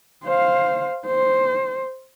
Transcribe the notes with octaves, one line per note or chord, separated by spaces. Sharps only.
C5 F5
C5